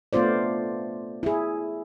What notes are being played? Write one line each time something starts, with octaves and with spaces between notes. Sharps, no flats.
A3 B3 F4 C5 D5
E4 G#4